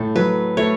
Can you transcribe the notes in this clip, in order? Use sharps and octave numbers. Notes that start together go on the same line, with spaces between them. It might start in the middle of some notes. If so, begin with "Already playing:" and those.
Already playing: A2 A4
F#3 B4
A3 C#5